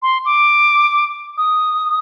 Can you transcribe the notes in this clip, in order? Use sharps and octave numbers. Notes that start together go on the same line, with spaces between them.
C6
D6
D#6